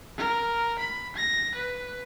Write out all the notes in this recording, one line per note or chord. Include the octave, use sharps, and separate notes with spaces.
A#4
B5
A#6
B4